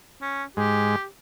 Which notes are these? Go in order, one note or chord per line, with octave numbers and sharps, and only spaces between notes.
C#4
G#2 G#3 G4